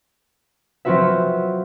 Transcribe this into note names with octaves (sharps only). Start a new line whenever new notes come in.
F#3 C4 F4 F#4 B4 E5